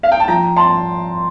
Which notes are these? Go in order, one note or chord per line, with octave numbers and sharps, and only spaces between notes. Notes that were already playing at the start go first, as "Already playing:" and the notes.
F5
G5
A5
F3 G5 A#5
A5 C6